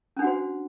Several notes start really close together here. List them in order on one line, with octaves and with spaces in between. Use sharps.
C#4 D4 F#5 F#4 C5